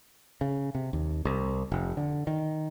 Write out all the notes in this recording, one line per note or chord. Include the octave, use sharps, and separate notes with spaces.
C#3
C3
D#2
C2
F1
D3
D#3